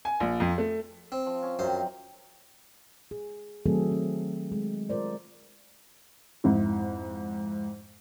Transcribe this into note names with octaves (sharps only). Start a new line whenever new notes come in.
G#5
A#1
F2
A3
C4
F3
C#4
F#2 C3 D#3 C5
G#4
D#3 F#3 A3 C4 G#4 A4
C4
G#3
F4 A#4 C5 D5
F2 G#2 E4